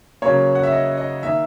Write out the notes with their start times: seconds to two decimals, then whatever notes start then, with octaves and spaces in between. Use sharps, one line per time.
0.22 C#3 F#3 A#3 C#5
0.55 F#5
0.63 E5
0.72 D#5
0.97 D#5
1.22 D#3 A#3 E5